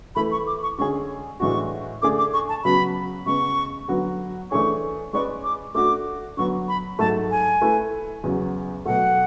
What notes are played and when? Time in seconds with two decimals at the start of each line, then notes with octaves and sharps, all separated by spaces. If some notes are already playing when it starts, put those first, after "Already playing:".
0.15 E3 A3 E4 B5
0.32 C#6
0.47 D6
0.63 C#6
0.78 D3 G#3 C#4 G#4 C#6
1.40 A2 E3 G#3 D4 F#4 C#6
2.02 D3 A3 D4 G#4 D6
2.18 D6
2.33 C#6
2.49 A5
2.64 C#3 F#3 B3 F#4 B5
3.26 C#3 G#3 B3 C#6
3.88 D3 F#3 B3 F#4
4.51 E3 A3 D4 G#4 C#5 C#6
5.13 G#3 C#4 G#4 B4 D5 C#6
5.44 D6
5.75 A3 D4 F#4 D6
6.37 D3 F#3 B3 C#6
6.68 B5
6.99 G#2 F#3 A3 A5
7.31 G#5
7.62 A3 E4 B4
8.23 E2 C#3 F#3
8.86 B2 F#3 A3 F#5